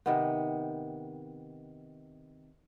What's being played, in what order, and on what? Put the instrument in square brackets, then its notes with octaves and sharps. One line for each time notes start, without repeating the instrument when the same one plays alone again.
[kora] C3 D#3 B3